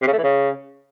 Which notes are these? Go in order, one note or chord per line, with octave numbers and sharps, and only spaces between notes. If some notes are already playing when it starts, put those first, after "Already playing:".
C3
C#3
A3
E3
C#3